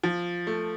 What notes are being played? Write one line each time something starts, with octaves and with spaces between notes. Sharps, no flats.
F3
A3